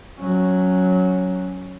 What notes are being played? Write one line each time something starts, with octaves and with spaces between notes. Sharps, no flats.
F#3 C#4